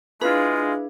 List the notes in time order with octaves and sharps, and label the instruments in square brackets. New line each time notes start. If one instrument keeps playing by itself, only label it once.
[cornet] G#3 [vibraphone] D4 G#4 F5 [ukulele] E4 B4 [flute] F4